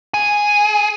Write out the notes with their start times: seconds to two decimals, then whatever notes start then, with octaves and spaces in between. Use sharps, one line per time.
0.14 G#4